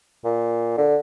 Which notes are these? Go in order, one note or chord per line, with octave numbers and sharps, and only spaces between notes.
A#2
D3